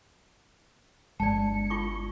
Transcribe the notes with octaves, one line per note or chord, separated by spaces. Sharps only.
G1 G#3 D5 A5 C#7
F4 C#6 D6